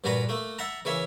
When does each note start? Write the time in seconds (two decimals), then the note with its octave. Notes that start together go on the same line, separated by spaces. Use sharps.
0.04 G2 A#2 D4 F#4 B4 A#5
0.29 A3 A#3
0.59 E5 F#5 A5 A#5
0.85 C#3 E3 A#3 C#5 E5